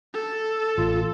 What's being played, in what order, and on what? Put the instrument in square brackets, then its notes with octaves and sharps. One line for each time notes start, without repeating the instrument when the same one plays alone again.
[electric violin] A4
[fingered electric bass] A1 [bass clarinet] F4